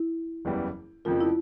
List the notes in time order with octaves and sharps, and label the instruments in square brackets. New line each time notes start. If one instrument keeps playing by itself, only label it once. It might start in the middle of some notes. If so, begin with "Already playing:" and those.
Already playing: [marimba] E4
[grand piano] F#1 E2 C#3 E3 G3
[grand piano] F1 F2 C#3 F3 A#3 [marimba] F4
[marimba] E4